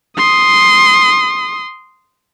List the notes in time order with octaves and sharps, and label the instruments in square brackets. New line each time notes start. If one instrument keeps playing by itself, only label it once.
[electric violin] C6 D#6